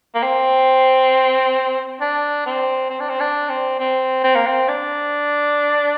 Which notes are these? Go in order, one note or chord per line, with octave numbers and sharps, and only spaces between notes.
A#3
C4
D4
C4
C4
D4
C4
D4
C4
C4
C4
A#3
C4
D4